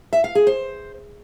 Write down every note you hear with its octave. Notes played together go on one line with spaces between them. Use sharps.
E5
F5
G#4
C5